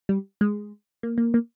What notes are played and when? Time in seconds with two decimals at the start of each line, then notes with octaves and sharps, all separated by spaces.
0.09 G3
0.41 G#3
1.03 A#3
1.18 A#3
1.34 A#3